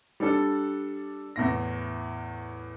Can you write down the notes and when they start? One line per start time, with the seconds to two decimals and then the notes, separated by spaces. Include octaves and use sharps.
0.20 G3 D4 A4
1.36 E2 A2 A#6